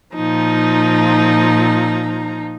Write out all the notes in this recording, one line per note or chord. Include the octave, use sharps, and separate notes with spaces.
A#2 F3 D#4 A#5